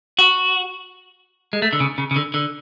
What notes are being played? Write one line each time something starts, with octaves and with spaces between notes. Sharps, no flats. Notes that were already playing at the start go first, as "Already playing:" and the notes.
F#4
G#3
A3
D3
C#3
C#3
C#3
D3
D3